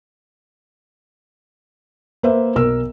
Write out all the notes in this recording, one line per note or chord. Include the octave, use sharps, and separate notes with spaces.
A#3 B4 C5 E5
B1 A#4 E6